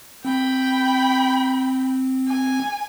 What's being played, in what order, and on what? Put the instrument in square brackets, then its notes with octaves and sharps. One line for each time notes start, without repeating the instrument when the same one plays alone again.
[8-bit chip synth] C4 [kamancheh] G5 B5
[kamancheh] G#5